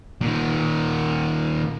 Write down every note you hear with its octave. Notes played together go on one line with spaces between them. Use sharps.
A#2 D#3